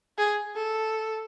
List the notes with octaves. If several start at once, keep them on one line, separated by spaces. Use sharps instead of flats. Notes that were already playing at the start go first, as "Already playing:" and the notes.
G#4
A4